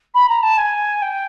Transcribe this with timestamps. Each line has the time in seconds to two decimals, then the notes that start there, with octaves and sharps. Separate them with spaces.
0.15 B5
0.29 A#5
0.43 A5
0.57 G#5
1.02 G5